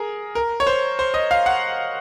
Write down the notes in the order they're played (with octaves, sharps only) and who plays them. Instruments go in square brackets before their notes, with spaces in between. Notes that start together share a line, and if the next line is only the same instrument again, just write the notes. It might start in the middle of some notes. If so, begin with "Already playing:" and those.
Already playing: [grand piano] G#4 A#4
A#4
C#5
C5
C5
D#5
F5
F#5